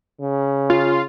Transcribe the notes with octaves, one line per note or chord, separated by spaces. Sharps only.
C#3
F4